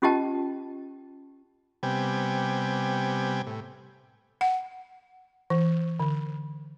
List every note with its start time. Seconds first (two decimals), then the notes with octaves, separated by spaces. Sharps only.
0.02 C#4 F4 G4 D#5 G5 A5
1.83 C3 G3 B3 G5 G#5
3.47 A2
4.41 F#5
5.50 E3
6.00 D3